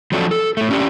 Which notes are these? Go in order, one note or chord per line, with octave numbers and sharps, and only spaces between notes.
F3 F#3 C4 D4 F#4 A4
A4
A2 A3
C#4 D4 G4